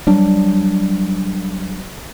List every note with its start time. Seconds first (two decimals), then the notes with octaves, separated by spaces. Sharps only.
0.07 F#3 G3 D4